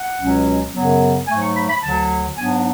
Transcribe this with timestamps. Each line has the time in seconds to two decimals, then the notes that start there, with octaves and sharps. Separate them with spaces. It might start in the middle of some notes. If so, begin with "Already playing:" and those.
Already playing: F#5
0.18 C#2 B2 F#3 C#4
0.74 F#2 C#3 F#3 B3
1.27 G#2 F#3 A3 G#5
1.41 C#6
1.55 B5
1.69 B5
1.82 D2 D3 F#3 A5
2.37 G#2 F#3 B3 D4 G#5